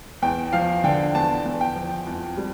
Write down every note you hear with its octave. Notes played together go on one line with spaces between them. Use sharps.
E2 G5
F3 F5
D3 G5
E2 A5
E2
G5
F3
F2
G3